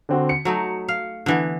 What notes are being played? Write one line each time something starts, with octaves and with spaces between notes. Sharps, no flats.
D3 C4 F#4
C#7
F#3 A3 D#4
F5
D3 E3 B3